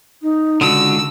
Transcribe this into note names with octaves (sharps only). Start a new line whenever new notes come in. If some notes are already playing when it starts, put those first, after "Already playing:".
D#4
C#2 F#2 D3 F#4 E6